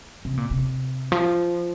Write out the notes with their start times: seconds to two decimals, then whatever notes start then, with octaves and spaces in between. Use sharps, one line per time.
0.25 C3
0.37 A#2
0.51 C3
1.12 F3